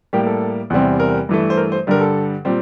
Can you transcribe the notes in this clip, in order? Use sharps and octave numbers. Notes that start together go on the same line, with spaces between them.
A2 G3 A#3 G4
A4
E2 C3 G3 C4
A#4
G2 E3 A3
C5
A#4
C5
G2 D3 G3 A#4
A4
A#2 G3 C4